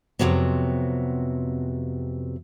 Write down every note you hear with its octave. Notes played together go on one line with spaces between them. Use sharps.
F2 A2 C3 F#3 B3